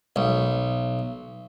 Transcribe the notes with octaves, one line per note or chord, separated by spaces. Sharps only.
B1